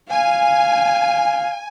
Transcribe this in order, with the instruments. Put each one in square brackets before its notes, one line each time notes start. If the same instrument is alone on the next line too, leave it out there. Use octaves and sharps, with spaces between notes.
[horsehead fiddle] F5 [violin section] G#5